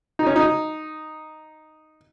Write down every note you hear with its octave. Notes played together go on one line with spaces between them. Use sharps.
D#4
C#4
D#4